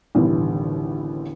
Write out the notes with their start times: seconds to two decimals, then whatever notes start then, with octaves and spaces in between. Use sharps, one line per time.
0.15 A1 D#2 B2 D3 E3 G3